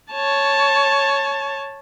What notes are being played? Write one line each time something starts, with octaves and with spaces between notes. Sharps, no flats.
C#5 A5